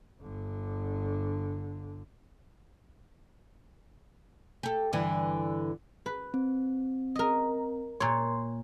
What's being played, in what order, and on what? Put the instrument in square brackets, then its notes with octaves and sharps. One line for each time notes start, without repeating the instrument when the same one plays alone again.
[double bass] G1 D3
[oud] G4 A4
G2 D3 E3
[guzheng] B4
[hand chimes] C4
[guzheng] A#4 D#5
[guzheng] A#2 C#5 [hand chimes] C6